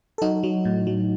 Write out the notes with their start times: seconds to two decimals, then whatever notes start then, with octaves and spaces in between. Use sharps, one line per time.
0.18 A4
0.22 F#3 D#4 F#4
0.43 F#3
0.65 A2
0.87 F#3